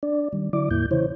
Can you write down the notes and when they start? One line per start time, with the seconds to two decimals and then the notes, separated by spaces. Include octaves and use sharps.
0.03 D4 D5
0.33 D#3 G3
0.53 D3 F#3 E4 D5 D6
0.71 E2 A2 A#3 E4 G6
0.91 C#3 E3 E4 C5 C#5